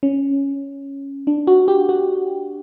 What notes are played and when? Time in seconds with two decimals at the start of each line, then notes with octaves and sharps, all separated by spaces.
0.03 C#4
1.27 D4
1.47 F#4
1.68 G4
1.89 F#4